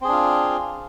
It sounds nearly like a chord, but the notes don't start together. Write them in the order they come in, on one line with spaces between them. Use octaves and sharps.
C4 G#4 D4 F4